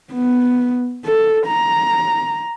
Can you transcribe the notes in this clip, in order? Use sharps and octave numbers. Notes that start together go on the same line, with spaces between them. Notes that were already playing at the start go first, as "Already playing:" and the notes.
B3
A4
A#5